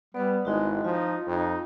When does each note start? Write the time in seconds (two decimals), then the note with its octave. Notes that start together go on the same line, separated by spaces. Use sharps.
0.15 G3 B3 B4 D5
0.45 G#1 G#3 D#4 E4 F#4
0.84 F3 D#4 F4
1.27 F2 D#4